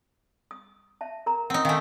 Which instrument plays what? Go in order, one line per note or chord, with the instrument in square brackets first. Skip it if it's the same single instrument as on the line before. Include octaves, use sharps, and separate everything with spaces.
[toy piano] D#6
E5 A5
A#4 A#5
[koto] C4 D#4 [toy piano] F#5
[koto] D#3 A3 [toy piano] F5 G5 G#5